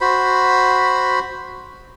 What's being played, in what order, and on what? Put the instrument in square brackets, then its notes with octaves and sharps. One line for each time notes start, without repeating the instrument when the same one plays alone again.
[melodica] F#4 C5 B5